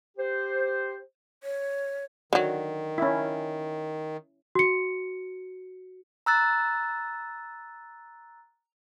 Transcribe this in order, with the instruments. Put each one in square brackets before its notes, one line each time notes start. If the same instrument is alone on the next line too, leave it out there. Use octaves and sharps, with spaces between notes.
[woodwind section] G4 C5
[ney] C#5
[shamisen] D3 F#3 [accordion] D#3
[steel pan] C#4 E4
[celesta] F#4 C#7
[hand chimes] A#5 E6 F#6 A6